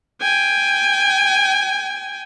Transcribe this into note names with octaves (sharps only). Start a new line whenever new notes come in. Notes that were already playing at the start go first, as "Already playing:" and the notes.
G5 G#5